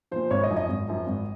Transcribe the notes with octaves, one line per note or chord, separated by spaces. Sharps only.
A#2 F3 C5
G#1 C#5
D#5
F#2 F3
D#5
G#1
F#2 F3
G#1